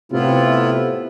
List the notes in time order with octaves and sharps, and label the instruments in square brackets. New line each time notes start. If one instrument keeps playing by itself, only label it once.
[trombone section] A2 C3 [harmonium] B3 E4 F4